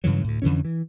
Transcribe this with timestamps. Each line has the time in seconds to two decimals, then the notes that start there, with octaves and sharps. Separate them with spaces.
0.04 G2 C#3 E3 F#3
0.24 D2 A2
0.42 F2 D3 E3 C#4
0.65 E3